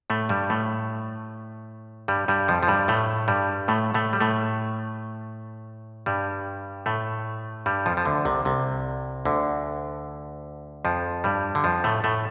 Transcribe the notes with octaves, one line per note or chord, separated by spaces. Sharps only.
A2 A3
G2 G3
A2 A3
G2 G3
G2 G3
F2 F3
F3
G2 G3
A2 A3
G2 G3
A2 A3
A2 A3
G3
A2 A3
G2 G3
A2 A3
G2 G3
F2 F3
F3
D2 D3
C2 C3
C2 C3
D2 D3
F2 F3
G2 G3
D3
F2 F3
A2 A3
A2 A3